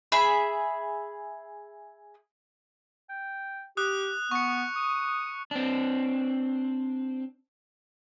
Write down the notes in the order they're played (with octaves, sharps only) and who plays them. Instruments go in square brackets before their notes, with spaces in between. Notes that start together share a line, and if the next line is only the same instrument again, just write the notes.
[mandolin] G#4 E5 B5
[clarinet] G5
[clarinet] G4 [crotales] D#6 F#6
[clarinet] B3 [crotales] C#6 C#7
[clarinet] D#6
[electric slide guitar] C4 D4